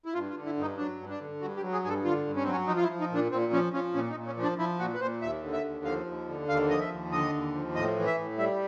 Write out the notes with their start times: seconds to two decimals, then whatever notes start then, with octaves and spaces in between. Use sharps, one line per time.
0.06 E4
0.14 G2 F4
0.30 F4
0.35 D3
0.46 E4
0.57 G2 D#4
0.77 F#3 D4
0.99 G2
1.10 D4
1.20 D3
1.41 G2 F#4
1.57 G4
1.62 F#3
1.73 G#4
1.84 G2 G#4
1.89 A4
2.04 D3 F4
2.25 G2
2.36 C#4
2.43 F#3 C4
2.51 C#4
2.67 F3 D#4
2.77 F4
2.83 E4
2.89 F3
3.00 D#4
3.11 A#2 D4
3.31 A#2 C4
3.53 F3 C#4
3.73 F3 C#4
3.94 A#2 C#4
4.11 D#4
4.16 A#2
4.27 C#4
4.37 F3
4.43 D4
4.58 F3 E4
4.79 A#2 F#4
4.94 B4
5.00 A#2 C5
5.21 D#2 E5
5.43 D3
5.53 E5
5.64 D#2
5.85 F3 F5
6.06 D#2
6.28 D3
6.48 D#2 F5
6.70 F3 D#5
6.80 E5
6.90 D#2
7.12 D3 D#5
7.33 D#2
7.53 F3
7.75 A2 D#5
7.96 E3
8.07 E5
8.18 A2
8.38 G3 E5